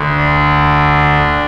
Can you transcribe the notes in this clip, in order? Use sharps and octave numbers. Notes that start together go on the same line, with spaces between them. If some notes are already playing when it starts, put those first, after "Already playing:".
Already playing: D2 D3
D4